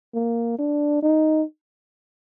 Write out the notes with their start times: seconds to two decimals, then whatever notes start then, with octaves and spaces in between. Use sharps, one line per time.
0.14 A#3
0.58 D4
1.03 D#4